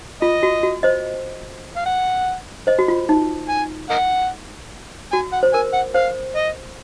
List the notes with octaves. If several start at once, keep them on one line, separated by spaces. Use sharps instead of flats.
F4 D#5
F#4
F#4
C5 D#5
F5
F#5
C5 D#5
F#4
F4
D#4
G#5
A#4 D#5 F#5
F#4 G#5
F#5
C5
A#4 G#5
F#5
C5 F5
D#5